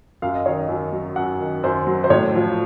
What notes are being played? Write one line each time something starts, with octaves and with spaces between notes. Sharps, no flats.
F#2 F5
D#5
D#3 C#5
D#5
F#2
F#3
F#2 F#5
D#3
F#2 C5
F#3
C5
A2 C#5
F3